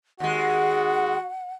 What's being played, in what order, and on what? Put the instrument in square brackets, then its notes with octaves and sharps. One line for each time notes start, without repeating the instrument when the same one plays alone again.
[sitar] D#2 G#3 [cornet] F#4 [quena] F#5